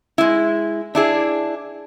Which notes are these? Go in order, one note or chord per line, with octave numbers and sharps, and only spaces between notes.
G#3 E4
D4 E4 G#4